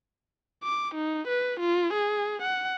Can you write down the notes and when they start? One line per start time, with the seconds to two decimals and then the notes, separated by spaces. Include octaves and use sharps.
0.64 D6
0.95 D#4
1.28 B4
1.60 F4
1.94 G#4
2.42 F#5